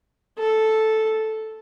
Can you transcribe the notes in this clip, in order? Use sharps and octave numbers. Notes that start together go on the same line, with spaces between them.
A4